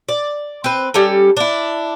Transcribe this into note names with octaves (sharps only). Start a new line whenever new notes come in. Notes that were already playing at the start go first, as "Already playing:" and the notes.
D5
C4 B4
G3 C#4 A4
D4 E4